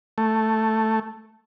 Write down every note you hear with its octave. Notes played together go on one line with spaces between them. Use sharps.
A3